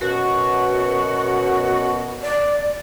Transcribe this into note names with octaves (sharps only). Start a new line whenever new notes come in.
F#2 B2 F#4
D5